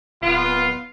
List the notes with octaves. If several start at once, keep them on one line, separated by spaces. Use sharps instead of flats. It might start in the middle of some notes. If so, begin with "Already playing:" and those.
D1 B3 F4